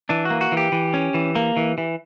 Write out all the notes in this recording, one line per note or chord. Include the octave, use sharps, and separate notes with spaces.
E3 D4
F#4
A#3
F#4
E3
G4
E3
C#4
E3
A#3
E3
E3